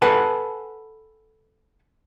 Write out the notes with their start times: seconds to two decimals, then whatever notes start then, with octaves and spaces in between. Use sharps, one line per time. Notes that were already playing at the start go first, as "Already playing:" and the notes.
0.02 A4 B4 F#5 G#5 A5